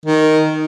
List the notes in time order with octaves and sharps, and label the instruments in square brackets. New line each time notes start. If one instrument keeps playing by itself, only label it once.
[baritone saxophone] D#3